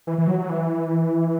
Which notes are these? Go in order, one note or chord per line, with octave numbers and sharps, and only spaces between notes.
E3
E3
F#3
F#3
E3